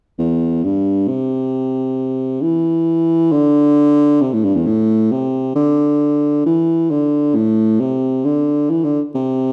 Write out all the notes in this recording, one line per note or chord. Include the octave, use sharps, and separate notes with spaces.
E2
G2
C3
E3
D3
C3
A2
G2
E2
A2
C3
D3
E3
D3
A2
C3
D3
E3
D3
C3